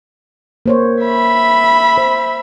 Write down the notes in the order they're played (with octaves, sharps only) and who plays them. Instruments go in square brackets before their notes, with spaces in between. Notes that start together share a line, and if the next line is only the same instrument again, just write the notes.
[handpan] A#3 C5 C#5
[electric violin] E5 B5
[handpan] C5